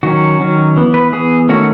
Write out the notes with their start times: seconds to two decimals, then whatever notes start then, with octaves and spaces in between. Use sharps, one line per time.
0.03 D#3 F#3 C#4 F#4
0.40 D#3 F#3 C#4
0.76 E3 B3
0.94 B4
1.12 E3 B3 G#4
1.49 D#3 A3 C#4 F#4